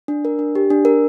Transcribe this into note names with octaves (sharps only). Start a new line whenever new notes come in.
D4
A#4
D4
G4
D4
A#4